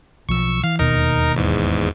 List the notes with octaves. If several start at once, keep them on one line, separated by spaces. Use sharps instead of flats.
B1 F3 C#6 E6
E3 F5
E1 D#2 B2 D#4 A#4
E2 G#2